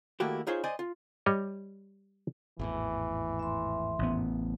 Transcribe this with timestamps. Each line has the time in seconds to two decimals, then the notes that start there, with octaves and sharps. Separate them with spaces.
0.20 D#3 A3 A#3 E4 F#4 G4
0.47 D#4 F4 G#4 C5 C#5
0.64 C5 D5 D#5 G#5 C6
0.79 F4
1.26 G3 C#5 D#5
2.59 G#1 E2 A2 E3
3.39 E5 C6
3.99 A1 B3